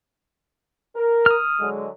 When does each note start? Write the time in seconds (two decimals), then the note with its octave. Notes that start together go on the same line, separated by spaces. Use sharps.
0.95 A#4
1.26 D#6 F6
1.59 D3 F#3 G#3